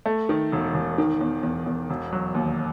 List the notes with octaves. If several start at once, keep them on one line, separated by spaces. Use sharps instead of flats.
A3
D#3
E1
E1
D#3
E2
E2
E2
E1
F#3
D#2